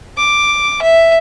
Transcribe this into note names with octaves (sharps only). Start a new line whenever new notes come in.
D6
E5